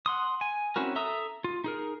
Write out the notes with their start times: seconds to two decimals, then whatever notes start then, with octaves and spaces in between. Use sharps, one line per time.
0.06 F#5 C6 D#6
0.41 G#5
0.76 C4 C#4 E4 F#4 A#4
0.96 A4 E5 A#5 D#6 E6
1.44 F4
1.64 D#4 G#4 A#4